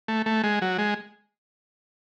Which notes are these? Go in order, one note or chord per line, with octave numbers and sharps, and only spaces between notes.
A3
A3
G#3
F#3
G#3